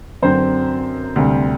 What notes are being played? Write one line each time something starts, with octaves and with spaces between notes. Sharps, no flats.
F#2 D3 F#3 C4 C5
D2 C3 G3